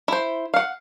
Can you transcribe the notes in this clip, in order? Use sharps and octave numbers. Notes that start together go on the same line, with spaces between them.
E4 C5
F5 F#5